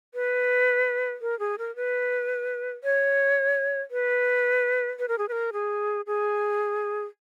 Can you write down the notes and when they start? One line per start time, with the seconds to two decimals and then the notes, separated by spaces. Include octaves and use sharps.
0.14 B4
1.21 A#4
1.39 G#4
1.58 A#4
1.76 B4
2.84 C#5
3.91 B4
4.99 B4
5.08 A#4
5.18 G#4
5.28 B4
5.32 A#4
5.53 G#4
6.07 G#4